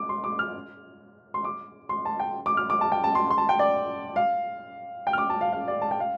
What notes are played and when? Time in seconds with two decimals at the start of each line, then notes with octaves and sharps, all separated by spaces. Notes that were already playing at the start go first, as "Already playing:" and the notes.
Already playing: D6
0.09 C6
0.24 D6
0.39 F6
1.34 C6
1.44 D6
1.89 C6
2.05 A5
2.20 G5
2.46 D6
2.57 F6
2.70 D6
2.81 A5
2.92 G5
3.04 A5
3.15 C6
3.30 C6
3.38 A5
3.49 G5
3.59 D5
4.16 F5
5.07 G5
5.13 F6
5.18 D6
5.30 A5
5.41 F5
5.53 F5
5.68 D5
5.82 A5
5.91 G5
6.00 F5